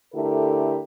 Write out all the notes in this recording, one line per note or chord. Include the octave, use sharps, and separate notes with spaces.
D3 A3 E4 G4 A4 A#4